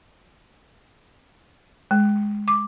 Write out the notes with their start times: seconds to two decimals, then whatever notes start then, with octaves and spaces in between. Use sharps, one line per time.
1.91 G#3
2.48 D6